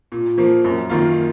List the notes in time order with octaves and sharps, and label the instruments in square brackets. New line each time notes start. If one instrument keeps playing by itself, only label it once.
[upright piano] A#2
F3 A#3
F#2
D#3 A#3 F4